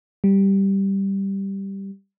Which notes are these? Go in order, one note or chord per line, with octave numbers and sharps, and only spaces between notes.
G3